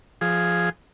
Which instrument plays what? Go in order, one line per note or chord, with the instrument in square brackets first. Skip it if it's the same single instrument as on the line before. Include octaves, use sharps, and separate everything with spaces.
[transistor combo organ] F3 G#4